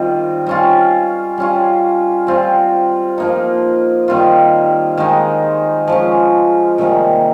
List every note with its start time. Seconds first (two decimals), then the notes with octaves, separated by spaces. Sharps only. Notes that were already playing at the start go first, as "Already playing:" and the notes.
Already playing: D#3 G3 C4 F4
0.46 G3 C#4 F4
1.38 G3 C#4 F4
2.27 G3 C4 F4
3.18 F3 A#3 D#4
4.08 D#3 G3 C4 F4
4.97 D#3 G#3 D#4
5.87 F3 G#3 C#4
6.78 C3 D#3 G3 A#3